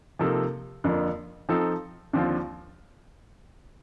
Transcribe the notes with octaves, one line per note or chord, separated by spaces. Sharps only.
C3 F3 A#3 D#4 A4
F2 D3 F3 A#3
F3 C4 D#4 A4
D#2 D3 F3 C4 F4